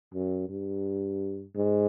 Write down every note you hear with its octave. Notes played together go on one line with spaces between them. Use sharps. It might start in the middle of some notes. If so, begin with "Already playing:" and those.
F#2
G2
G#2